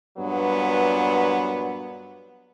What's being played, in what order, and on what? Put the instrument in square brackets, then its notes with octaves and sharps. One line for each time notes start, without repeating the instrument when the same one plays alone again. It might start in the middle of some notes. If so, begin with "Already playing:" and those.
[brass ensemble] G2 A#2 F#3 B3